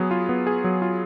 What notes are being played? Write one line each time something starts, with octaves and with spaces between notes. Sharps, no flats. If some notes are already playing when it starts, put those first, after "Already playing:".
Already playing: F#3 B3 G#4
F4
B3
G#4
F#3
F4